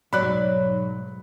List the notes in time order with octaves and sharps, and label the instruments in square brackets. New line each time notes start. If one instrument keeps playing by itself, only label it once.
[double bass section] B1 G#2 [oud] F#3 [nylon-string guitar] F#4 D5 [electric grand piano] B5 F#6